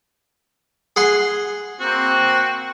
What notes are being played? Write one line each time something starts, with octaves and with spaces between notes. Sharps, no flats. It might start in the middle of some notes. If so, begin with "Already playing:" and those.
G#4 F#5 C6
A#3 C4 F#4